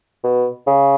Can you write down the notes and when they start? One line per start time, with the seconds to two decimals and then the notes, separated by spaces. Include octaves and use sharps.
0.24 B2
0.67 C#3